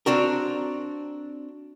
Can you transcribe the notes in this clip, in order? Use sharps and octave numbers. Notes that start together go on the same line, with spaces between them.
C4 D4 F#4 A#4